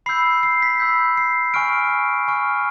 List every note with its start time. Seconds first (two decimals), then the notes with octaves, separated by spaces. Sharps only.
0.06 B5 E6 G6 C7
0.43 C7
0.62 B6
0.80 B5 E6 G6
1.17 C7
1.54 G#5 C#6 F6 D7
2.28 G#5 C#6 F6